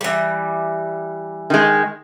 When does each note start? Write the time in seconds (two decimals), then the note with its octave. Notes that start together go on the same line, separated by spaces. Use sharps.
0.01 E3 G3
1.50 D#3 G#3